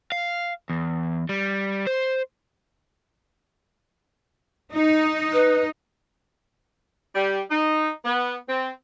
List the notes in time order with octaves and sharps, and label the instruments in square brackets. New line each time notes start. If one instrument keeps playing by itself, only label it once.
[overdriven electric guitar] F5
E2
G3
C5
[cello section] D#4
[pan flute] B4
[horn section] G3
D#4
B3
C4